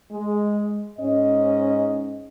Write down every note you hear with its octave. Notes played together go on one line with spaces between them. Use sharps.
G#3
G#2 C#4 D#5